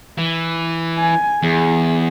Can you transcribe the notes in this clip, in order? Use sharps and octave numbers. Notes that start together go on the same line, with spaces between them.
E3
G#5
E2 G#4